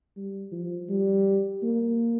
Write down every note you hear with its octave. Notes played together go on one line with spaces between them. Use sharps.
G3
F3
G3
A#3